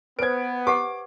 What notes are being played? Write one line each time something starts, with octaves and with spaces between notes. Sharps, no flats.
B3 B4 C5 G#6 D7
G4 B4 F#5 D6